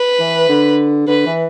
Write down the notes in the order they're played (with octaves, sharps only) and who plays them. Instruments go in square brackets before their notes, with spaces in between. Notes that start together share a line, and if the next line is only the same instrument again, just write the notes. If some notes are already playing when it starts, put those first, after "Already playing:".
Already playing: [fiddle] B4
[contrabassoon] E3
D3
[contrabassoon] D3 [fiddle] B4
[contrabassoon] E3